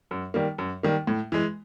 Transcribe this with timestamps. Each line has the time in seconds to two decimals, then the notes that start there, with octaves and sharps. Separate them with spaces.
0.11 F#2
0.34 D#3 G3 A#3
0.58 F#2
0.83 D#3 G3 A#3
1.07 A2
1.32 E3 G#3